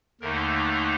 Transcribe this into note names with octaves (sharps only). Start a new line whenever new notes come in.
D#2 D3 A3 D#4 A#4